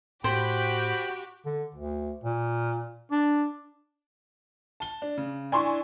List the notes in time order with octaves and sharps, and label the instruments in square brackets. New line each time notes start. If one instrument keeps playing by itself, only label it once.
[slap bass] A2 [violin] F#4 G4 [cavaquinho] C5 [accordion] G5 B5
[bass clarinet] D3
D2
A#2
D4
[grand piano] A5 G7
D4
C#3
[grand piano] D4 E4 [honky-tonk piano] G#5 C6 C#6